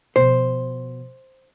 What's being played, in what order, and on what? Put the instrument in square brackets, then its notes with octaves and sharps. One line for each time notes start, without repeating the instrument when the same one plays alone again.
[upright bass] B2 F3 [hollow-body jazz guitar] C5